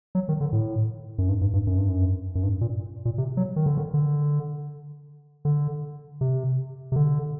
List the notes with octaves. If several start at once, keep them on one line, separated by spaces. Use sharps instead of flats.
F#3
D#3
D3
A2
F#2
G2
G2
G2
F#2
G2
F#2
F#2
G2
A#2
A#2
C3
F#3
D#3
D3
D#3
D3
D3
C3
C3
D3